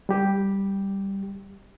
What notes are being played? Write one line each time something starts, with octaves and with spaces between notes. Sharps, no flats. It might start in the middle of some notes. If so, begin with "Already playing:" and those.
G3 G4